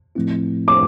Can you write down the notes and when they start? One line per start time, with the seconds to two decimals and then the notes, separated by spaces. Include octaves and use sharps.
0.15 A2 F3 A3 C4 E4
0.68 D6